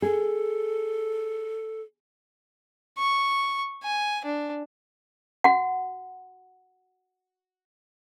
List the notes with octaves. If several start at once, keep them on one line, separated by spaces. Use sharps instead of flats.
G#4 A4
C#6
G#5
D4
F#4 F#5